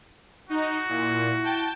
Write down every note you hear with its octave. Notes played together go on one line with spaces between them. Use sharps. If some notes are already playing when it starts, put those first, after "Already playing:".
D#4 F#4
A#2 E4
G5 A5 G6